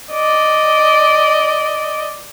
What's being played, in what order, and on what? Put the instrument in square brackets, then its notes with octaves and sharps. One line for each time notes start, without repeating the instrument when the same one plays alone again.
[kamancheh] D5 D#5